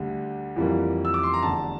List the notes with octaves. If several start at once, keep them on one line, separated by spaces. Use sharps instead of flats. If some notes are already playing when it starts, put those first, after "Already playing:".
Already playing: D2 D3 G3
F2 E3 G3 A#3
E6
D6
C6
A#5
F1 E2 D3 A5